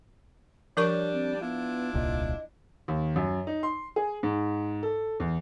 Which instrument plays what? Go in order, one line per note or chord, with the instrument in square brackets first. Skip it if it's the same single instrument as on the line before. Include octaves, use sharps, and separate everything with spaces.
[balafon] F3 A#4 C#6 [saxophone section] G3 D4 [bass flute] C#5
[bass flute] C4
[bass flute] B3 [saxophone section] D4 E4 F4
[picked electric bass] D#1 C2 A#2 [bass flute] D#5
[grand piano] D#2
F#2
D#4
C6
G#4
G#2
A4
E2